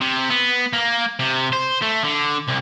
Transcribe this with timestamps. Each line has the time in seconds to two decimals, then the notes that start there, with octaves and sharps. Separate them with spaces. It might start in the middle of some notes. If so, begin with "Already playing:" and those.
0.01 C3
0.31 B3
0.73 A#3
1.20 C3
1.53 C5
1.82 A3
2.04 D3
2.48 C2